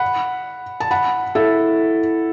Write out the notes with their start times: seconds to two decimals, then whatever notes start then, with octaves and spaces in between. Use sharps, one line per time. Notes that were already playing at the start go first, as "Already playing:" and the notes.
Already playing: F#5 B5
0.80 A5
0.91 F#5 B5
1.35 E4 A4